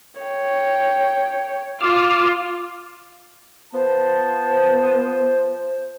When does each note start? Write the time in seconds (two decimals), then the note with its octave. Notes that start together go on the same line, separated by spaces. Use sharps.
0.21 C#5 G5
1.81 F4 D6 E6 F6
3.74 F3 B3 C5 A5